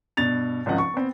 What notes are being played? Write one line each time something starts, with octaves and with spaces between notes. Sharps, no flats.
G2 B2 A6 F7
G#1 C#2 F3 D#5 F#5
C#6
B3 C4